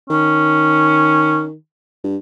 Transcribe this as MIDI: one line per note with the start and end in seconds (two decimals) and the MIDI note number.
0.10 1.54 51
0.10 1.43 61
2.04 2.16 43